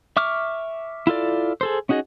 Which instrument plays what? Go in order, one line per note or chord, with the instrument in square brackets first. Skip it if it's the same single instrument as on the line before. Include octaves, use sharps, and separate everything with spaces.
[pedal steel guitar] E5 C#6 D6 F6
E4 F4 A4 D5
G#4 A4 C5
C#4 D#4 F#4 G#4 D#5